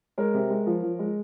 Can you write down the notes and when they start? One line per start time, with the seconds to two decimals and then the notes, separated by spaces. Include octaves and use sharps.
0.18 G#3 A#4 C#5
0.34 C3
0.50 G#3
0.67 F3
0.83 F3
0.99 G#3